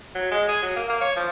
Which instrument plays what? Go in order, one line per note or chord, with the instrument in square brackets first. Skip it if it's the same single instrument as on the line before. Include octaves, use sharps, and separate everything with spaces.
[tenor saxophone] F#3
G#3
G#4
F#3
A#3
A#3
C#5
F3